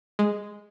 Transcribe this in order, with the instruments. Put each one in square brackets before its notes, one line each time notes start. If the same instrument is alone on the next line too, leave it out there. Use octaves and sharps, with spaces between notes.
[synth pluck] G#3